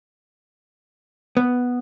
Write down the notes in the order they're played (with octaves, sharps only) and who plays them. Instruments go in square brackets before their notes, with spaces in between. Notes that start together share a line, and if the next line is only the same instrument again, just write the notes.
[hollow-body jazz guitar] B3